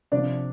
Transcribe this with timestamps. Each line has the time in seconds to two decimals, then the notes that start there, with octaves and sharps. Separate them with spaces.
0.12 C3 F3 C4 D4 D5